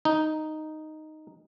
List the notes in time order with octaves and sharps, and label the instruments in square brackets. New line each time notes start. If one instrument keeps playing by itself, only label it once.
[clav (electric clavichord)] D#4